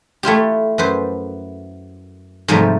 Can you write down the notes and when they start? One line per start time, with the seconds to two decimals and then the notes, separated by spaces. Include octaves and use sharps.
0.23 A3 E4 F4 G4
0.78 F#2 B4 C5
2.48 G#2 C3 F3 G3 A3